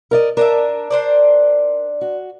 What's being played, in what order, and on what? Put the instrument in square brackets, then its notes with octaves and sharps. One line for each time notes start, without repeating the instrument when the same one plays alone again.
[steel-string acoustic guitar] A#4 D5 D#5
[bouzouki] D4 D#5 E5 [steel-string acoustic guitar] A#4
[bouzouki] D4 C5 D5
[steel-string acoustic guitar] F#4